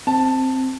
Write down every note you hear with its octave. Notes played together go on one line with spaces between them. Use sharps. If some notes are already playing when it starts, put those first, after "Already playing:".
C4 A5